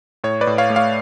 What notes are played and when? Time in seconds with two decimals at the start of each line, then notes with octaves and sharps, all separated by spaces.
0.24 A2 C#5
0.41 B4 D5
0.47 A2
0.58 C#5 F5
0.70 A3
0.76 C#5 F5